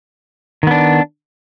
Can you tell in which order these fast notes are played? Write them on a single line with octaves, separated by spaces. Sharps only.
D#3 B3 D4